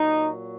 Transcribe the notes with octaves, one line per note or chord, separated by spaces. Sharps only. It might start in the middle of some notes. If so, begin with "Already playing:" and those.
Already playing: A#2 F#3 D#4